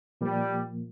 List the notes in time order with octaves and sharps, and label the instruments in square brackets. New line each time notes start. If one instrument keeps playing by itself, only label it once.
[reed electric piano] A#2 F3 A#3 [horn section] G3